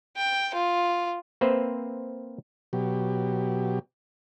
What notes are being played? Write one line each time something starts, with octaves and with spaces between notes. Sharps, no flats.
G5
F4
A#3 C4 B4 C5 E5
B2 F#3 G4